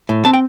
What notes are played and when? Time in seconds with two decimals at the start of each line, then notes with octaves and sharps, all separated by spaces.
0.09 A2
0.25 C4 A5
0.33 G5